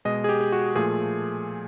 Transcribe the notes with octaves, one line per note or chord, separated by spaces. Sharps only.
B2 G#3 D#5
G#4
G4
G4
F#4
A#2 F3 A3 G#4